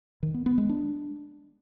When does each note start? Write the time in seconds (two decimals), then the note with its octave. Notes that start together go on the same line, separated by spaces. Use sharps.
0.23 D#3
0.34 B3
0.46 B3
0.58 G#3
0.69 D4